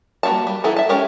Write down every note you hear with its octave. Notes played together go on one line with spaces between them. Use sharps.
G3 A#3 E4 F#4 A5
G3
E3 B3 D#4 E4 A4
E5 A5
G#3 C#4 G4 A#4